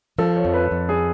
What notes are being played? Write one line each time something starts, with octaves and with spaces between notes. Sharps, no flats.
F3 A4
C#5
F2
B4
F2
G#4